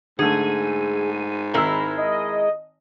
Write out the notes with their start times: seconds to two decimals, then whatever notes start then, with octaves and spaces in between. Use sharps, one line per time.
0.19 G#2 D3 A3 G#4 D#7
1.54 G#1 G#3 E4 A#4 E6
1.97 D#5